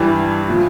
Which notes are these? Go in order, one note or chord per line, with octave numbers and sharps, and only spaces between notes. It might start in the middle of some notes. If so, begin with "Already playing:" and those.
Already playing: G2 E3 G3 E4
A2 F3 F4